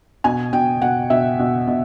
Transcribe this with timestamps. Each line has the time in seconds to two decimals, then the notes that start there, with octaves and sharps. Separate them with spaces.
0.24 B2 G#5
0.53 B2 G5
0.82 B2 F#5
1.10 B2 E5
1.39 B2
1.67 B2